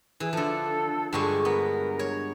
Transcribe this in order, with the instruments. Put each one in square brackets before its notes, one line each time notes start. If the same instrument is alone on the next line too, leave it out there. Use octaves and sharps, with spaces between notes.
[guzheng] E3 [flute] G#4
[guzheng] D3 F3 [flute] A4
[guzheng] G2 D3 G#3 [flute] C#6
[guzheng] B3 [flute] A#4
[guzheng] C#5